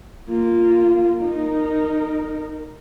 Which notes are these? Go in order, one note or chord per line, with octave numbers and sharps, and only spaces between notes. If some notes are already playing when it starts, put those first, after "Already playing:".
A#3 F4
D#4 A#4